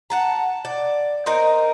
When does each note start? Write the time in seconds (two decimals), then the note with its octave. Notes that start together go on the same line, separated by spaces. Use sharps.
0.10 F#5 A5 A#5
0.65 D5
1.26 C4 D#4 A#4